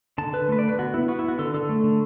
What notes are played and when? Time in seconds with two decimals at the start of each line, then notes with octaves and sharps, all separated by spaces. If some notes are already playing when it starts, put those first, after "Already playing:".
0.18 D3 A5
0.33 D3 B4
0.48 A3 B4
0.59 D3 D5
0.69 B4
0.79 B3 F#4
0.94 B3 E4
1.08 B3 F#4
1.19 E4
1.24 B3 F#4
1.39 D3 A4
1.54 D3 A4
1.69 A3
1.84 D3